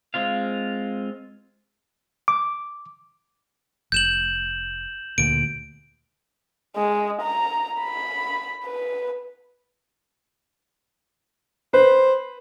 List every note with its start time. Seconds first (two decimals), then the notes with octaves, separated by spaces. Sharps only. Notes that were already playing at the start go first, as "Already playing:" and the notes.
0.14 G#3 C4 F4 F5
2.28 D6
3.92 F1 G6 E7 F#7
5.18 D2 A#2 D7
6.77 G#3
7.22 A#5
7.81 B5
8.65 B4
11.73 B4 C5